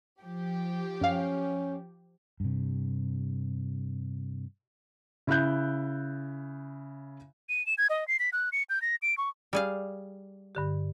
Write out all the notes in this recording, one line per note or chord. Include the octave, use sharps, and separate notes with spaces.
F3 G4
F#2 C#4 F5
G2 C3
C#3 E4 E5 F#6 G6
D#7
E7
G#6
D#5
C7
B6
F#6
C#7
G6
A#6
D7
C#6
G3 G#4 F5
G2 D3 G4